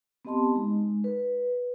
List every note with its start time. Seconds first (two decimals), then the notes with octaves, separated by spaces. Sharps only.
0.25 B3 C4 G4 D#5 A5 C6
0.54 G#3 D#4
1.04 B4